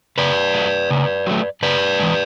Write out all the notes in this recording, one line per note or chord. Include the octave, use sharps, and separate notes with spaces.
C#3 B4 D5
F#3 A3
C#3
F#3 A3
C#3 B4 D5
E3 G#3